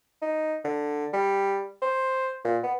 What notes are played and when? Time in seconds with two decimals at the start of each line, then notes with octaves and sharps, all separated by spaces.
0.22 D#4
0.65 D3
1.13 G3
1.82 C5
2.45 A#2
2.63 B3